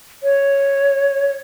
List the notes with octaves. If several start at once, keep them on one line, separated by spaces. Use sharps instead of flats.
C#5